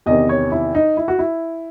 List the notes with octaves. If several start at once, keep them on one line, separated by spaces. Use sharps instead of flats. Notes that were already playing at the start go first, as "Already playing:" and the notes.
E2 C3 D#3 D#5
C#5
E4
D#4
E4
F#4
E4